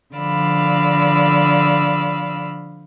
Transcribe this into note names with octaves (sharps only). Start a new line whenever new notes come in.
D3 F3 D5 F5 B5 E6